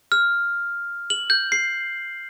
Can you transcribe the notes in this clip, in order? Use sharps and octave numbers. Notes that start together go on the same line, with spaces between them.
F6
F#7
G6
C7